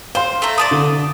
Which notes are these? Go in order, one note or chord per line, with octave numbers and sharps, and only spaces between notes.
C5 F5 C6
A3 A4 A#5
D5 A5 D#6
D3